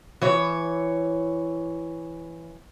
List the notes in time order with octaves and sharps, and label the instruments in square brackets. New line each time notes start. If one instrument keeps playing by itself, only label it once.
[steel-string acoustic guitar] E3 C#5